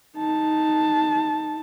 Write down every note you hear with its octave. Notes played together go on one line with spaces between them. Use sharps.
D#4 A5